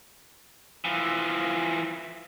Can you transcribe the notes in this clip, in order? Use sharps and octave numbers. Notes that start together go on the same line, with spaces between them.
E3 F3